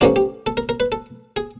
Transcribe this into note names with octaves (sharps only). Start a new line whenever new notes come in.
G2 D3 F3 A#3 C#4 F4
G4
A4
A#4
A#4
B4
A4
G#4